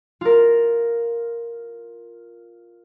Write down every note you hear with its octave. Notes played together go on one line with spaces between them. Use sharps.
F4 A#4